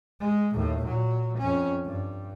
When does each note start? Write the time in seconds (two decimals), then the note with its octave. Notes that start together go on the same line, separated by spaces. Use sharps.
0.20 G#3
0.54 D#2 A2
0.85 A#2 F#3
1.38 F2 C#4
1.85 G2